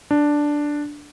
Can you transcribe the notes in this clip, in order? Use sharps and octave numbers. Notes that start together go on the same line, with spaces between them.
D4